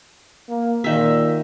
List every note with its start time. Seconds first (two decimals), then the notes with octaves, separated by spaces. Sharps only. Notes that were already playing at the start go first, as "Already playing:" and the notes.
0.49 A#3
0.84 A#2 D#3 E5